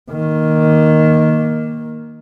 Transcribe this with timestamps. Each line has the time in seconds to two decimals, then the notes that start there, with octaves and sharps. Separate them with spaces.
0.10 D#3 A#3